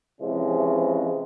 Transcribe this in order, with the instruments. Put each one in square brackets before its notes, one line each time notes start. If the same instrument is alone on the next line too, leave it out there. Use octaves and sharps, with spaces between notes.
[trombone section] C3 E3 F3 G#3 C#4